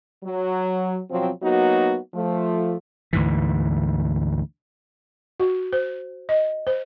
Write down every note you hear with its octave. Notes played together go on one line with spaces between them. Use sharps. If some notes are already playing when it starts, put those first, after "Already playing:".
F#3
B2 F3 F#3 C4
F#3 A#3 B3 D#4 F#4
F3 A3
D2 G#2 E3
F#4
C5
D#5
C5